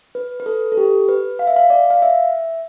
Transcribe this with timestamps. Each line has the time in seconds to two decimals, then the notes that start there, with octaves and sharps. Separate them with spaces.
0.15 B4
0.40 B4
0.46 A4
0.72 A4
0.77 G4
1.09 B4
1.39 F5
1.47 E5
1.56 F5
1.70 D5
1.90 F5
2.02 E5